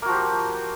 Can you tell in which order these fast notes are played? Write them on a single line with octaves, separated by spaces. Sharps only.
A#3 F#4 F3 G4